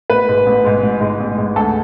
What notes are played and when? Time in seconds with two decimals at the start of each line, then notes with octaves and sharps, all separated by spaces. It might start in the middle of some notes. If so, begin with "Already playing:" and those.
0.10 A1 B4
0.28 G#2 G#3
0.46 A1
0.65 G#2 G#3
0.83 A1
1.01 G#2 G#3
1.20 A1
1.38 G#2 G#3
1.56 D2 A4